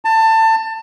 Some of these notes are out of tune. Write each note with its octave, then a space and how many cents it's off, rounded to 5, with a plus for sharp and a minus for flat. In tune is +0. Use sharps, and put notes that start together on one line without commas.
A5 +20